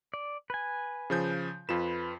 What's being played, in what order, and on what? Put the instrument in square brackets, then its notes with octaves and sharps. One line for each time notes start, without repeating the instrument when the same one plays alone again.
[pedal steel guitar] D5
B4 G#5
[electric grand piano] C#3 F3 G6
[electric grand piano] F2 F4 E7 [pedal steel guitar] B4